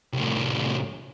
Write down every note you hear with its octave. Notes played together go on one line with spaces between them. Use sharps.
C2 A2